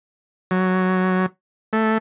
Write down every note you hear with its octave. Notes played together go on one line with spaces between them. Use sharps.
F#3
A3